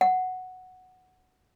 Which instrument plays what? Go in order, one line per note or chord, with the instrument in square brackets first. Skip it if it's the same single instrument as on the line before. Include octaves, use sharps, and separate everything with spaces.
[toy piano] F#5